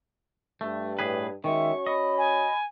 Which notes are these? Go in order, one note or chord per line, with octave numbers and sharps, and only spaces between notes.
G2 A3
A2 G#4 B4
D#3 G#3 C#4 F#4 C#5 E5 C#6
D#5 B5
G#5